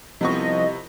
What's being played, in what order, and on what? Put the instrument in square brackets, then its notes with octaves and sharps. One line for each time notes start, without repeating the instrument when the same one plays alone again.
[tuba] C2 [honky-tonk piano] C3 B3 C#6 [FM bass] F3 [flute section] D#5